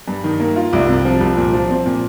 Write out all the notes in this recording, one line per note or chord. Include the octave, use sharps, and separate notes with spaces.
G2
D#3
A#3
F4
C2
C3
F3
C2
A#2
F3
C4
A#2